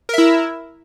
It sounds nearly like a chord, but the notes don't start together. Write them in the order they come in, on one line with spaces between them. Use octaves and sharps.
A#4 E5 E4